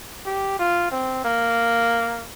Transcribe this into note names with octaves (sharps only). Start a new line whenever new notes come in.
G4
F4
C4
A#3